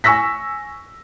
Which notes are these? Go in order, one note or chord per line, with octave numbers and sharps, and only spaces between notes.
G#5 C#6 E6 A#6 B6